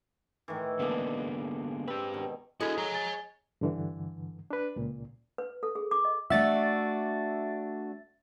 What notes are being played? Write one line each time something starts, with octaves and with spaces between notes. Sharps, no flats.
A2 D#3 E3
D3 G#3 A#3 B3 D4
C4 G4 B4
B2 D#3
G#3 E4 F#4 A4 D#6
C#5 A#5
G#5 A6
G2 D3 E3
D4 B4
C#2 A#2
B4
A4
G#4
D6
D#5
A3 D4 F#4 E5 A6